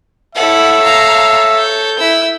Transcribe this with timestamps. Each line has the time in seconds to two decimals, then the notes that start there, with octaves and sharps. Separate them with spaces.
0.35 E4 A4 C#5 E5 F#5
0.83 F5 A#5
1.58 G6
1.98 E4 E6